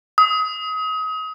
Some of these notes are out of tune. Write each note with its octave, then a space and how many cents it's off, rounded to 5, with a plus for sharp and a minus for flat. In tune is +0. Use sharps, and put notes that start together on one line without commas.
D#6 +30